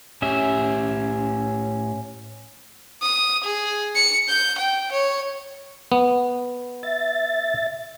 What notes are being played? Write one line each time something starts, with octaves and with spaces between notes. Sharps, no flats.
A2 C#4 G4 E5 G#5
D#6
G#4
C#7
G6
G5
C#5
B3
E5 A6